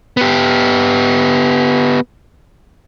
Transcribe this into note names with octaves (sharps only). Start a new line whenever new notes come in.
B3 G4